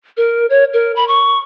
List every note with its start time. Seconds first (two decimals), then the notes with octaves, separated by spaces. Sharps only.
0.17 A#4
0.50 C#5
0.74 A#4
0.96 B5
1.08 C#6